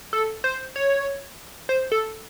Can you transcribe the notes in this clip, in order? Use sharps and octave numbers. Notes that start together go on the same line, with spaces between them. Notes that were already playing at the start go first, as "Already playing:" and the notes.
A4
C5
C#5
C5
A4